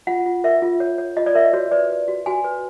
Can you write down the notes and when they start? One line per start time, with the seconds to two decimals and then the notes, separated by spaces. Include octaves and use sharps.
0.07 F4 F#5
0.26 F4
0.44 A#4 E5
0.62 F4
0.80 C#5
0.98 C#5
1.17 F4 D#5
1.26 D5
1.35 A#4 E5
1.45 D#5
1.53 F#4 C#5
1.72 B4 D5
1.90 B4
2.08 F#4
2.26 F#4 G#5
2.44 B4